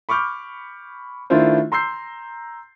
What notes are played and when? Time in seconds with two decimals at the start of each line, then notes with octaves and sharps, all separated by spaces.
0.09 B5 C#6 D6 F6 G6
1.30 D#3 A3 D4 E4 F4 C5
1.72 A#5 C6 E6 G6 C7